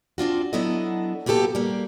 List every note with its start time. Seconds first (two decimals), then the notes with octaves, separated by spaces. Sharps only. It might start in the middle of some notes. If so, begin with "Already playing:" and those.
0.18 C4 D4 F4 F#4
0.53 F#3 B3 D4 E4 A4 D#5
1.26 A#3 B3 F#4 G4 A4
1.55 G3 A#3